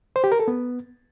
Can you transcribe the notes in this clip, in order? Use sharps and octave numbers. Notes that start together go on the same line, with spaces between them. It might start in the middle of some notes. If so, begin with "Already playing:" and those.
C5
G4
A#4
A4
B3